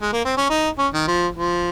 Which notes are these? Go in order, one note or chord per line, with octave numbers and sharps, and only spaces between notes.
G#3
A#3
C4
C#4
D#4
C#4
D#3
F3
F3